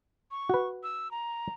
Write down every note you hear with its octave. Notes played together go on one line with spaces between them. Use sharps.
C#6
F#4 B4
E6
A#5